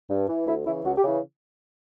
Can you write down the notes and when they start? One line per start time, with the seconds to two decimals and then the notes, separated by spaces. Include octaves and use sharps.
0.10 G2
0.28 E3
0.47 D2 E4
0.66 C#3 E3 E4
0.84 C#2 F#4
0.97 G4
1.04 C#3 E3